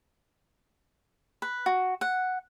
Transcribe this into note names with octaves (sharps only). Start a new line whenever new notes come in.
B4
F#4
F#5